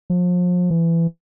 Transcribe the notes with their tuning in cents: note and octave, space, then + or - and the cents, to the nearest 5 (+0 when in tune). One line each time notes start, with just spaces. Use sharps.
F3 +35
E3 +20